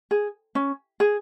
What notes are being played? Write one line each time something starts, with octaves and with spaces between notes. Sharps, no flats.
G#4
C#4
G#4